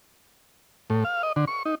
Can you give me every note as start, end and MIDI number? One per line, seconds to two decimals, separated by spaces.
0.90 1.04 45
1.04 1.22 77
1.23 1.32 75
1.36 1.45 50
1.47 1.63 85
1.65 1.75 63